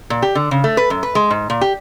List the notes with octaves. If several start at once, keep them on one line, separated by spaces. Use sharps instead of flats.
A#2
G4
D3
C#3
A3
B4
F#2
B4
G#3
G#2
A#2
G4